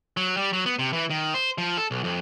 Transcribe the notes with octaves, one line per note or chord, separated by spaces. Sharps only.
F#3
G3
F#3
B3
C3
E3
D#3
C5
F3
A4
B1
F2